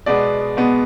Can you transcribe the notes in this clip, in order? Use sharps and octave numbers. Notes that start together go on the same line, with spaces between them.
B2 G#3 B3 D5
B2 G#3 B3